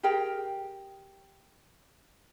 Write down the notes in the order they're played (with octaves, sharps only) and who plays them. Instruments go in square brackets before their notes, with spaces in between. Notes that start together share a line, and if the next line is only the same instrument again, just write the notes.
[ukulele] G4 G#4 A#4 G5